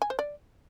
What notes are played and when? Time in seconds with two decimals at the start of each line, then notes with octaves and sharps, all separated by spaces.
0.02 G#5
0.10 C5
0.19 D5